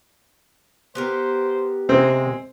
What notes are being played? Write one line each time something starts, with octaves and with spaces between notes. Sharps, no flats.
B3 G4 A#4 C5
C3 G#3 C4